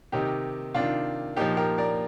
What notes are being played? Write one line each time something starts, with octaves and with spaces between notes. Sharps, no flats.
C3 D#3 D#4 G4
C3 D#3 D4 F4
A#2 F3 D#4 G4
G4 A#4
A#4 D5